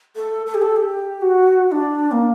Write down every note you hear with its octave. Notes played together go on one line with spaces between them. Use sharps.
A4
A4
G4
A4
G4
F#4
F#4
D4
A#3